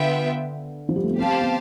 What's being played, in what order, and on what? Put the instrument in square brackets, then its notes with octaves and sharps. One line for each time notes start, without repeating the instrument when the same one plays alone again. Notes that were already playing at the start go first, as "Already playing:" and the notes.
Already playing: [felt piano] D3 [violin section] B3 F4 B4 E5 G5
[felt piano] F3
G3
A3
B3
[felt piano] C4 [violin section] G4 C5 F5 A5
[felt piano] B3